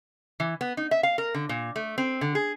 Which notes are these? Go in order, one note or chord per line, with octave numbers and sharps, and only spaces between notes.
E3
B3
D#4
E5
F5
A#4
D3
A#2
A3
C4
D3
G#4